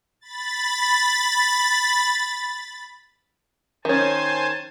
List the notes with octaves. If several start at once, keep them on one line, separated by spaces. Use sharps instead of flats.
B5 A6
D#3 C#4 C5 G#5 A5